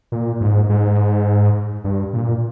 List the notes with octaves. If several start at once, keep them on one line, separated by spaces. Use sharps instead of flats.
A#2
G#2
G#2
G2
A#2